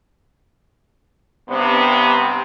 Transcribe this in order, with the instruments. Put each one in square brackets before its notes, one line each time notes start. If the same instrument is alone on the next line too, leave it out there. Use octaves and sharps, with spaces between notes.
[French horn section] G2 C3 [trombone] B3